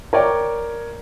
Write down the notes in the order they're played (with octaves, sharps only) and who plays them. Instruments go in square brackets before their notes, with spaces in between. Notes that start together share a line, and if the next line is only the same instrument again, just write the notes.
[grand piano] A#4 C#5 D5 G5